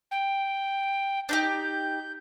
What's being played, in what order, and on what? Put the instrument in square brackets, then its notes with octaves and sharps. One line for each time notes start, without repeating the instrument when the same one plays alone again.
[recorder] G5
[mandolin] D4 D#4 G4 [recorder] G6